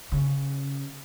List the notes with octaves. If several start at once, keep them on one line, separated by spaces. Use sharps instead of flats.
C#3